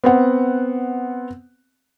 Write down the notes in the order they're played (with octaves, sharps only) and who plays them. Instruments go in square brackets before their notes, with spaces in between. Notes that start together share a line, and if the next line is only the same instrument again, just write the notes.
[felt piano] B3 C4 F#5